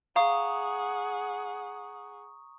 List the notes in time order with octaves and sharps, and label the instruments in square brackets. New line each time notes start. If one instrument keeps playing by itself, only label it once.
[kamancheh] G#4 F#5 [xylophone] F5 [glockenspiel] A#5 C#6 D#6